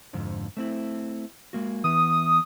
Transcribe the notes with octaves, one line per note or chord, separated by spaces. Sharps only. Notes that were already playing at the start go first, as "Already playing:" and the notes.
F2 G#2 D3
A3 C4 E4
G#3 A#3 F#4
E3 B3 D#6